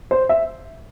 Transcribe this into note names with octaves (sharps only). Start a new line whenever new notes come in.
C5
E5